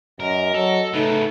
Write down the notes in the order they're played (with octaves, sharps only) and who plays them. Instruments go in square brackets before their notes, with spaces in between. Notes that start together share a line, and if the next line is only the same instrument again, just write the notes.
[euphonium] F#2 [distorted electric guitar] A#4 [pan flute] D#5
[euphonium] F#3 [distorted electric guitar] A4
[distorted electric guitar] C#3 B3 [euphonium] A3 [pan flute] D#4